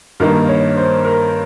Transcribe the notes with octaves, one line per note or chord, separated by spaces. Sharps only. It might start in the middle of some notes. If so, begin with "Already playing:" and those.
G2 D#3 A#3 D#4 A#4
C#5
C5
A#4